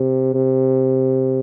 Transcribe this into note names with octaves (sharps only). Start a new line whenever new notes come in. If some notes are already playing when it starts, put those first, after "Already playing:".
Already playing: C3
C3